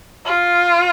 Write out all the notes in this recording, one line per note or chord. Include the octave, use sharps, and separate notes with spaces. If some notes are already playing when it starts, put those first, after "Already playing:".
F4